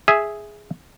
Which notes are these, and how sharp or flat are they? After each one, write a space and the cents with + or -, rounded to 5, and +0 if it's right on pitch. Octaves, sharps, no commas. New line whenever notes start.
G#4 +0 E5 +0